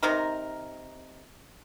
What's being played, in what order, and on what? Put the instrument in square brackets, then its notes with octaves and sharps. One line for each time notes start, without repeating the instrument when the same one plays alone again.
[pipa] C3 D#4 A#4